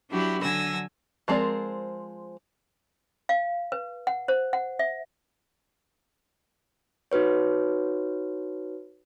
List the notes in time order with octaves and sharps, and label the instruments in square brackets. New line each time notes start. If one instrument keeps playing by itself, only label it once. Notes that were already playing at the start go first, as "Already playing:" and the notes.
[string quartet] F#3 D4 E4 F#4 G4
D3 F#3 G#5 E6 A#6
[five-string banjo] F3 G#3 C4 A#4 D5
[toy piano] F5
B4
F#5
C5
F#5
E5
[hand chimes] D#4 F#4 B4 C#5